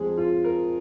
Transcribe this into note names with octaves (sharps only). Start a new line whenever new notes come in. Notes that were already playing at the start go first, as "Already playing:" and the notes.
Already playing: F2 F3 G#3 G#4
F4
A#4